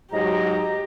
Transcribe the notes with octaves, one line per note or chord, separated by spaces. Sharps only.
G#2 F#3 G4 D#5 A#5